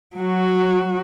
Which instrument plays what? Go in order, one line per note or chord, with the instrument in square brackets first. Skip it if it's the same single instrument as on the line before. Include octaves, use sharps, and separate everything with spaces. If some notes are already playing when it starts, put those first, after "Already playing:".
[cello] F#3 F#4